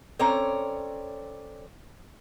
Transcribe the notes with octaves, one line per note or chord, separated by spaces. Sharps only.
C4 C#4 A4 C#5 D5 A#5